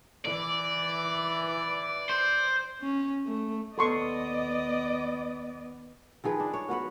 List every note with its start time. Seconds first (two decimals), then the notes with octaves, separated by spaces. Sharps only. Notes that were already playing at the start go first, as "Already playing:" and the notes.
0.25 E3 D5
2.09 C5
2.81 C#4
3.26 A3
3.78 D#2 B3 A4 D5 D#5 C6 C#6
6.24 D#3 F3 G#4 B4
6.40 D4
6.53 C#5
6.68 B3 F#4 B4 F#5